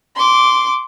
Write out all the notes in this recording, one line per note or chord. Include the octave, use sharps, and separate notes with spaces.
C6 D6